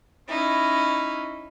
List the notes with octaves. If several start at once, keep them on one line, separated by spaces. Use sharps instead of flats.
C#4 D#4 E4